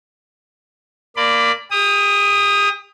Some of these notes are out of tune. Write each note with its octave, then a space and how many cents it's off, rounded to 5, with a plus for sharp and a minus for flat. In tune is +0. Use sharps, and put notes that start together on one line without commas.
A#3 -5 D5 +0 B5 +30
G4 +40 D#6 +0